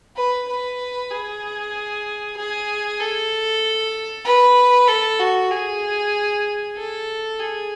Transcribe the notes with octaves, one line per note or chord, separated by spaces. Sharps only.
B4
B4
G#4
G#4
A4
B4
A4
F#4
G#4
A4
G#4